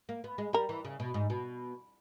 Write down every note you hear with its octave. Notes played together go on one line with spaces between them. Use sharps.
A#3
B3
G#3
G3 A#4
E3
C#3
B2
G#2
B2